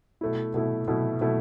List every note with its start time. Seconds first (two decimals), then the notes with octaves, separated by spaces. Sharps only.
0.21 B2 A3 E4
0.54 B2 A3 E4
0.88 B2 A3 E4
1.21 B2 A3 E4